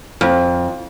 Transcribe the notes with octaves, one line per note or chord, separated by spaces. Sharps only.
F2